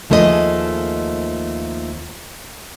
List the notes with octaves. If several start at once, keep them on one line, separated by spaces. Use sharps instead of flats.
D#2 F3 A3 G#4 A#4 D#5